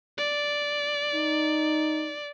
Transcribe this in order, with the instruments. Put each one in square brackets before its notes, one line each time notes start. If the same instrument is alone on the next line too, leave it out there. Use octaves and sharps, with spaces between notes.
[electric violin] D5
[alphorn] D#4